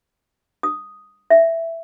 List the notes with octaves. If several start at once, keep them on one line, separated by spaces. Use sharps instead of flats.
D#6
E5